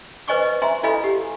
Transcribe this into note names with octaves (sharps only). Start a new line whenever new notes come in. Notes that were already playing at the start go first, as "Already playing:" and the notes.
B4 C5 D#5 G#5 C#6 D6
D#5
E5 G#5 A#5 C6
E4 A4 D#5 F5 G#5 B5
G4